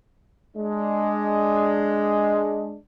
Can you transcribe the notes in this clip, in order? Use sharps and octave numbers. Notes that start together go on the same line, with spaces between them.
G#3 D4